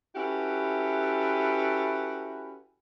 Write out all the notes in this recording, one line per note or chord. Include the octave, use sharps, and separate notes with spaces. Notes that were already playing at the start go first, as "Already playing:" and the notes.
C#4 E4 F#4 G4 A4 B4